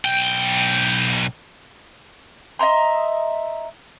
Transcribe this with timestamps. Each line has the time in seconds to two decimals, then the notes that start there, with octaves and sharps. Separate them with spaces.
0.05 B1 G5
2.59 D#5 E5 A#5 C6